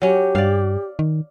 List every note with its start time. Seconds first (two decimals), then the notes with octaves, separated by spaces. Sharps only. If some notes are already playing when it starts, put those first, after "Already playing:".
0.02 F#3 C#4 G4
0.35 G2 D5 F5
0.99 D#3